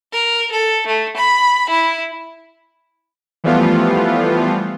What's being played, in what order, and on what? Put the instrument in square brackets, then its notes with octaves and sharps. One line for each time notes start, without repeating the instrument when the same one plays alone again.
[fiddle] A#4
A4
A3
B5
E4
[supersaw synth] E3 F3 G3 A3 B3 F4